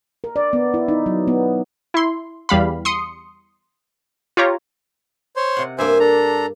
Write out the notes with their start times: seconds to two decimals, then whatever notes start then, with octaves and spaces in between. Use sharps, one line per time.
0.24 A#4
0.36 D5
0.53 B3
0.74 E4
0.88 D#4
1.06 F#3
1.28 B3
1.94 E4 C6
2.49 E2 G3 F5 B5
2.85 C6 D#6 C#7
4.37 F4 G4 C#5 A#5
5.36 C5 C#5 C6
5.56 C3 F#5
5.78 G2 A#3 C5 E5 G#5
6.00 D4 A4 A#5